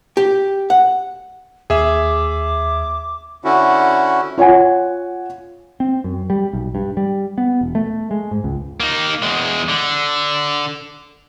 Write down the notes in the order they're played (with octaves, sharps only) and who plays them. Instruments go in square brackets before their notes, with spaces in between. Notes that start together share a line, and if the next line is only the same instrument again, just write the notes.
[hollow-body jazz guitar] G4
F#5
[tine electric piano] D#2 [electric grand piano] G#4 E5 [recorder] D6
[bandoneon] D3 C#4 E4 F#4
[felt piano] F4 C#5 F#5 G#5
[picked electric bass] C4
F#2
G3
B1
G2
G3
B3
E1
A3
G#3
G#2
C#2
[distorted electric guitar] A#3 D#4
E2 G#3
D3